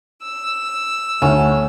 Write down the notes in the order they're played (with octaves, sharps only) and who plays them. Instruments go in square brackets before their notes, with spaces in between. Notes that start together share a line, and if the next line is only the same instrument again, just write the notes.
[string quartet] E6
[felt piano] D2 [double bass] A3 [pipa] C#4